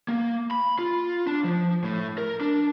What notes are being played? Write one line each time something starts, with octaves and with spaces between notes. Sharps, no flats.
A#3
B5
F4
D4
F3
A2
A#4
D4